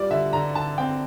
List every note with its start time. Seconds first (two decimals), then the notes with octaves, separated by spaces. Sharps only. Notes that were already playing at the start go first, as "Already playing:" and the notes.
Already playing: G3 F4 D5
0.10 D3 E5
0.33 D3 A#5
0.55 D3 A5
0.78 C4 G5